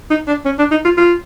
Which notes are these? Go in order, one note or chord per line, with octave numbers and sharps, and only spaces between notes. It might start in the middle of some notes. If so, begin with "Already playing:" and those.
D#4
D4
C#4
D4
D#4
F4
F4